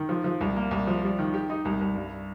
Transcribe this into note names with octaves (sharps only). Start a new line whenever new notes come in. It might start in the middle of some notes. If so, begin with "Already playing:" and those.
Already playing: D#3
F3
F3
C2
A#3
C2
F3
G3
D#3
G4
D#4
C2
C2
G2